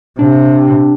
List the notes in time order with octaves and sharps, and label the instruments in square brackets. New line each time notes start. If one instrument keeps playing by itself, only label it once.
[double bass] C3 [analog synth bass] D4